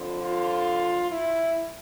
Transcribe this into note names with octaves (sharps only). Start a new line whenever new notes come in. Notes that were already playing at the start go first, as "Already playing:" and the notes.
Already playing: F2 D3 F3
F4
E4